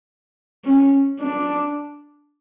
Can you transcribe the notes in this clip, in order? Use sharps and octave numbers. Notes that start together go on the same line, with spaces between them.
C#4
D4